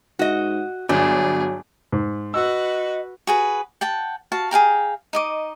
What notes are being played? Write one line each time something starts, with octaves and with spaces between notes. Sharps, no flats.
G#2 F#4 D#5
G1 F#3 D4 G#4
G#2
F#4 B4 D#5 E6
F#4 G#4 B4
F#5 G5 A5
F#4 F5 A5
G#4 F5 G5 A#5
D#4 D#5 D6